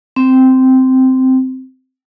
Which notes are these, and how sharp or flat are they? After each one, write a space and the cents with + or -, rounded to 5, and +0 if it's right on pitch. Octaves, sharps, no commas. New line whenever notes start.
C4 -10